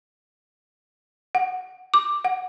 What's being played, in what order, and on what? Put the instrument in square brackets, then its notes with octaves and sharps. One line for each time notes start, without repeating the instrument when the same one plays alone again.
[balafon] F#5
D6
F#5